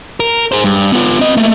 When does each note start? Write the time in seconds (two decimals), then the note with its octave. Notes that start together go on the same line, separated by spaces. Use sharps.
0.20 A#4
0.52 G#4 C5
0.64 G2
0.92 B3 F4
1.19 C4 D#5
1.37 A3 A#3